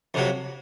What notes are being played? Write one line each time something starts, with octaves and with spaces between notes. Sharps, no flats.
F2 C3 F#3